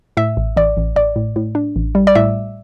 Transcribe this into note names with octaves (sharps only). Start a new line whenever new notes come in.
A2 E5
A1
A1 D5
A1
A1 D5
A2
A2
D4
A1
G3
D5
A2 E5